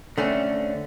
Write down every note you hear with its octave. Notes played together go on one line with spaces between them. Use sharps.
D3 A3 C4 C#4